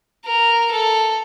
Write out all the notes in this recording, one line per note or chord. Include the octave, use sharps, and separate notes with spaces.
A#4
A4